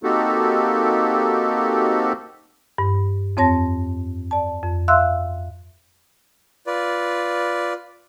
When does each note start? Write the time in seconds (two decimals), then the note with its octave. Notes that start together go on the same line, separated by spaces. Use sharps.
0.03 A#3 C4 D#4 F#4 G4 A4
2.78 G2
3.37 F2 C4 C#5 A5 A#6
4.31 D5 A5
4.63 F2
4.88 E5 F5 C6 E6 F#6
6.67 F4 B4 D5